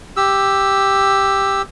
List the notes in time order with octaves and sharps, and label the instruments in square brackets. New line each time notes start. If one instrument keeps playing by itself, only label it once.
[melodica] G4 E6